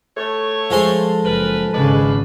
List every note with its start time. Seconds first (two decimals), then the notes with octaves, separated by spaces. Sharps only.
0.17 A3 A4 C#5
0.70 F3 G#3 C6
1.25 F#1 A#4 B4
1.73 G#1 C#3 G#3 D4 B4